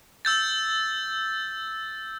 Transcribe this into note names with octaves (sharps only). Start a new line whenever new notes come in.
E6 G6 A6